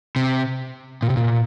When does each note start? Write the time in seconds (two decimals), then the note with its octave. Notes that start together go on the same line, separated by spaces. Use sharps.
0.16 C3
1.02 A#2
1.10 C3
1.17 A#2